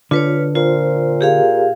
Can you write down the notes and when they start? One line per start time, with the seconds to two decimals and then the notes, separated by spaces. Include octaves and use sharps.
0.11 D3 F4 B4 C#5
0.55 A#2 F4 C5
1.21 G4 G#4 F5